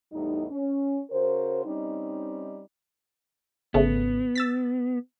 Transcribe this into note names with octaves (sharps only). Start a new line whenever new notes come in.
E2 A2 G3 D#4
C#4
C#3 F#4 A#4 C5
G3 C4 C#4 D#4
G#1 C#3 A3 B3
E6 A6 B6